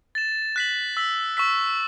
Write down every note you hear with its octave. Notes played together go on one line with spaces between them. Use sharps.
A6 E7
F#6 B6 F#7
E6 B6 F#7
C#6 E6 B6